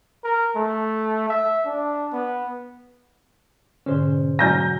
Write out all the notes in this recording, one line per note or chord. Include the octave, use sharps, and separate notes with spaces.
A#4
A3
E5
D4
B3
G#2 B2 D3 C#4 C5
F#3 G#5 F6 G6 A#6